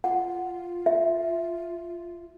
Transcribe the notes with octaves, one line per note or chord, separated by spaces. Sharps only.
F4 F#5
E5